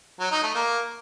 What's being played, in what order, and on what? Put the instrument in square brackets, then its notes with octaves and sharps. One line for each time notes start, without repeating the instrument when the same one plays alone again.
[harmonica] F#3
D#4
A3
A#3